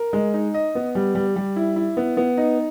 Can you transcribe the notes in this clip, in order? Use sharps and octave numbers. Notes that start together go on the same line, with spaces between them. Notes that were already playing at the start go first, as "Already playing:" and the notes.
Already playing: A#4
G#3
D#4
D#5
B3
G3
G3
G3
E4
E4
B3
B3
D#4